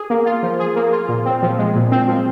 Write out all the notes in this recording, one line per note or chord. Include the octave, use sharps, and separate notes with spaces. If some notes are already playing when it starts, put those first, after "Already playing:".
Already playing: G#4
A#3
F4
F3
G#4
A#3
F4
A#2
C4
F3
G#3
A#2
C4
F3